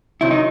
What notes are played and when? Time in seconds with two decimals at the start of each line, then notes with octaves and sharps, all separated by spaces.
0.21 C3 D#3 F#3 E4
0.31 D#4